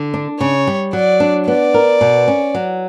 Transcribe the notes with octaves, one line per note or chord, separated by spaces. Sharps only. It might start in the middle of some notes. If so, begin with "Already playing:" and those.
Already playing: D3
D4
C#3 C#5
G3
F#3 D5
D4
B3 D5
A#4
B2
C#4
F#3